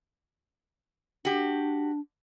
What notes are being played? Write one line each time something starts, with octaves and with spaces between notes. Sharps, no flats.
D4 F#4 G4